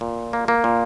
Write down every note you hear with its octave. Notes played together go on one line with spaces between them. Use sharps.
A#2
A#3
A#3
A#2